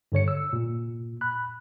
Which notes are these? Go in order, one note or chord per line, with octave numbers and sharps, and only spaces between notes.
G2 D3 C#5 C#7
E6
A#2
B5 F#6